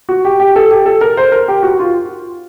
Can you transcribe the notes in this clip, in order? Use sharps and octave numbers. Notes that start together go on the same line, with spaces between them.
F#4
G4
G4
A4
G4
A4
A#4
C5
A#4
G4
F#4
F4